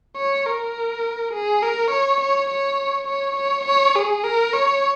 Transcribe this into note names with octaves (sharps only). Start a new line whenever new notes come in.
C#5
A#4
G#4
A#4
C#5
C#5
C#5
C#5
C#5
C#5
G#4
A#4
C#5